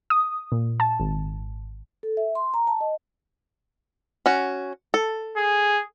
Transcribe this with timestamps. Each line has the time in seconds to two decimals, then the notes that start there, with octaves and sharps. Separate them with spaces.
0.10 D#6
0.52 A#2
0.80 A5
1.00 G#1
2.03 A4
2.17 E5
2.35 C6
2.54 A#5
2.67 A5
2.81 D#5
4.26 C#4 F#4
4.94 A4
5.37 G#4